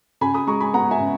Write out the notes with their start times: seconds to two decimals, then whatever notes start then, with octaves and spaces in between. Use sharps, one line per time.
0.21 C#3 G#5 B5
0.34 B5 D#6
0.47 G#3 A#5 C#6
0.60 G#5 B5
0.74 B3 F#5 A#5
0.91 E5 G#5
1.00 C#3